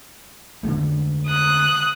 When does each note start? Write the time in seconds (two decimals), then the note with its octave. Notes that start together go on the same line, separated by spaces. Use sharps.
0.63 D3 G#3 A3
1.25 D#6 F#6